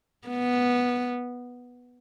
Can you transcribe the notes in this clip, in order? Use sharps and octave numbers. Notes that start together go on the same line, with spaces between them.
B3